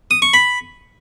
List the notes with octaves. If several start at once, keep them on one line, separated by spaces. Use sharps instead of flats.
D#6
C#6
B5